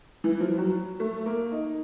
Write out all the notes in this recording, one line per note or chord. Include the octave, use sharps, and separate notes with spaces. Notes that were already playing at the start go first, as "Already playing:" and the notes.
E3
F3
F#3
A3
A#3
D#4